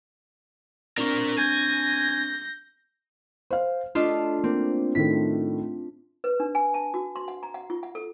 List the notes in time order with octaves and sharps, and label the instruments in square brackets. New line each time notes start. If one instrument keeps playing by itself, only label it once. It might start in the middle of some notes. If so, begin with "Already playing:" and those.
[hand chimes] C4 D4 C#6 [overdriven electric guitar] A#4 D5
[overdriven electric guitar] G#5 [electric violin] G6 A#6
[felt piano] C5 F5
[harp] A3 D4 F4 [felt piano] D#5
[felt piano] A#3 [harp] C4
[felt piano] A2 D#3 A3 [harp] B6
[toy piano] B4
D4
G#5
A5
F#4
C6
F#5
A#5
F#5
F4
F#5
A4